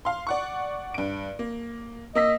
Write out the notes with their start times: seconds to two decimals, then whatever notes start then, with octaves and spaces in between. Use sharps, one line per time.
0.05 F5 C6
0.27 D5 F#5 C#6
0.94 G2 D7
1.39 A#3
2.15 A#3 D#5 E6 B6